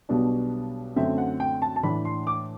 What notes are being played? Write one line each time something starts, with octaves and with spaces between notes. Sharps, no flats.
B1 B2 G3 B3 D4
F#2 D3 F#3 A3 C4 E5
F#5
G5
A5
A5
A2 E3 A3 D4 B5
C6
D6